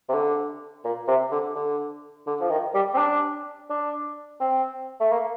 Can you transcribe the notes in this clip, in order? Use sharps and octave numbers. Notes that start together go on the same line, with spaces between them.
C3
D3
A#2
C3
D3
D3
D3
F3
D#3
G3
C4
D4
D4
C4
A3
A#3